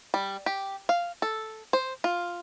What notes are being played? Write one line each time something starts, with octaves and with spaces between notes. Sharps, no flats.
G3
G4
F5
A4
C5
F4